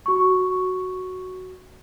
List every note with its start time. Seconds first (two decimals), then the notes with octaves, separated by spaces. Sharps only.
0.06 F#4 C#6